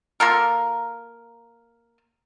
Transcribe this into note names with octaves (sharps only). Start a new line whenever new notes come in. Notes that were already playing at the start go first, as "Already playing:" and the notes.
A#3 F4 A4 A#4